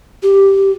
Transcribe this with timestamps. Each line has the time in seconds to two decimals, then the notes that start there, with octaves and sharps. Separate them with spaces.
0.23 G4